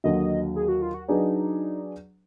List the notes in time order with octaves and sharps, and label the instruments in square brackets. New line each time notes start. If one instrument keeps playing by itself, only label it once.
[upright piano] D#2 D3 F#3 [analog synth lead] D#5
[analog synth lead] G#4
F#4
F4
F#4
[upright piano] F#3 D4 G#4 B4 D5 [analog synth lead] D#4